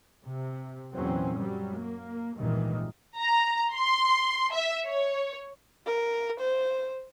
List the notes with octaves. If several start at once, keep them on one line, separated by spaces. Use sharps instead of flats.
C3
E2 A#2 E3 F#3 C4 C#4
F#2 F#3 G3
A#3
G#1 C#2 G2 A#2 D#3 E3
A#5
C6
E5
C#5
A#4
C5